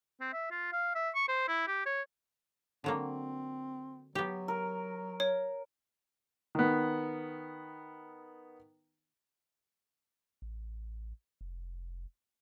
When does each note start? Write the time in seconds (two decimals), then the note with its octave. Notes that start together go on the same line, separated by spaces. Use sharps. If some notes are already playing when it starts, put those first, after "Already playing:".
0.21 C4
0.33 E5
0.51 F4
0.73 F5
0.95 E5
1.15 C#6
1.28 C5
1.48 E4
1.68 G4
1.86 C#5
2.84 D3 F#3 A#3 C4
4.15 F#3 B3 G4
4.48 A#4
5.20 C#5
6.55 D#3 B3
10.42 A1
11.41 F1